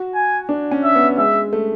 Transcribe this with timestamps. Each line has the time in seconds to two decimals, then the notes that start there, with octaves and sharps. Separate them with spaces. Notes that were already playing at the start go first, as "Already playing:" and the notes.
Already playing: F#4
0.14 G#5
0.49 D4
0.71 C#4
0.84 E5
0.95 B3
1.18 G#3 E5
1.53 A3